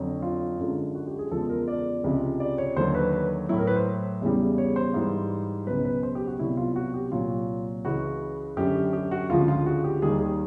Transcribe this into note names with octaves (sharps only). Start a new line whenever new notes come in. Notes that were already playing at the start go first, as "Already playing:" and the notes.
Already playing: F2 D3 F#3
F4
F#2 D3 F3 G#3
F#4
G4
G#4
E2 C#3 F3 G#3 A4
A#4
D5
C#2 C3 F3
D5
C#5
D#2 D3 F#3 C5
B4
B4
A2 F#3 E4
A#4
B4
C5
E2 C#3 E3 G3
C#5
C5
G#2 E3 G3
C#2 B2 F#3 B4
B4
C5
G4
F#4
C2 B2 F#3 E4
F4
F#4
G4
C2 A#2 F#3 F4
C#2 C#3 E3 F#4
F#2 D3 F#3 G4
G4
F#4
D2 C#3 F3 G#3 F4
F4
F#4
G4
D#2 D#3 G3 G#4
G#4